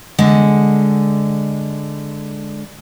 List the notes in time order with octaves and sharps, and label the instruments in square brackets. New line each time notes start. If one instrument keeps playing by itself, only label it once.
[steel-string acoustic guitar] D3 G#3 F#5